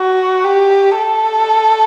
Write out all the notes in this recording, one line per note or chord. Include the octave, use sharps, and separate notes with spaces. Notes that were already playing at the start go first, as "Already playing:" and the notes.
Already playing: F#4
G4
A4